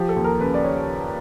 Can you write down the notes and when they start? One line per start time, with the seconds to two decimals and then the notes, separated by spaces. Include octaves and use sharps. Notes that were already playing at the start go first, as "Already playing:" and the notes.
Already playing: F3 G4
0.09 A4
0.16 D#2
0.24 A#4
0.40 C#3 B4
0.54 D5
0.64 C#5